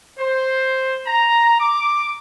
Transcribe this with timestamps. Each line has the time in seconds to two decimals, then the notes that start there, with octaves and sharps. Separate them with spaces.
0.19 C5
1.07 A#5
1.60 D6